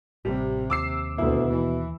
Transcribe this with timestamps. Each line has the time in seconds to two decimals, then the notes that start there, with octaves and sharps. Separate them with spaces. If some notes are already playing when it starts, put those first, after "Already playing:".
0.25 A1 C3 G3
0.70 D#2 D6 E6 C7
1.18 D2 B2 E4
1.50 E3